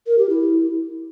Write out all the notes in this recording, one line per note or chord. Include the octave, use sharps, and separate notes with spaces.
A#4
G4
E4